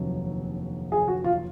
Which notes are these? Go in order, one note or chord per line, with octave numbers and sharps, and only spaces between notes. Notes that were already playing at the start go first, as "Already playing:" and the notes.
Already playing: F1 D#2 D3 F#3
G#4
F#4
F4